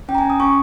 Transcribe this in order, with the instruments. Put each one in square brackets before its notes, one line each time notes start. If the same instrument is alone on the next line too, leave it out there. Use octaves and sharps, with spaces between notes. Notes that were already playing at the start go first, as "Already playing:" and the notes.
[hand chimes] C#4 G5
A#5
G#5
C#4
D#6
C#4 C#6